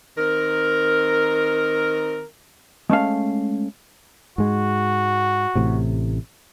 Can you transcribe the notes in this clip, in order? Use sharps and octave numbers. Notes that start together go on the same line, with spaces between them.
D#3 C4 A#4
G#3 A3 C#4 F5
G#2 G#3 F#4
A1 A2 C3